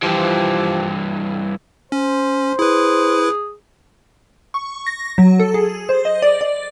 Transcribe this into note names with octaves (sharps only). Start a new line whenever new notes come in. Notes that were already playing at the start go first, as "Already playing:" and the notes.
G2 E3 F3 G4
C#4 C5
E4 G#4 B4
C#6
A#6
F#3
A4
G#4
C5
D#5
D5
D5